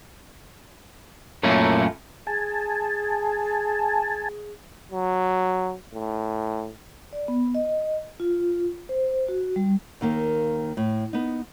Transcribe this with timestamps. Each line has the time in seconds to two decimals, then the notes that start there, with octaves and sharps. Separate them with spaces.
1.43 F#2 A#2 A3 A#3 C#4 E4
2.27 G#4 G#5 A5
4.91 F#3
5.94 A2
7.13 D5
7.28 B3
7.55 D#5
8.20 F4
8.89 C5
9.29 F#4
9.56 G3
10.01 D#2 D#3 A#3
10.77 A2
11.13 B3 D#4